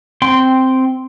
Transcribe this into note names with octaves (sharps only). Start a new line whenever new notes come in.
C4 G5 C6